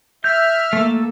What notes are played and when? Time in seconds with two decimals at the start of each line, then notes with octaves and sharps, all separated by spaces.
0.24 E5 F6 G6
0.73 A3 A#3 A4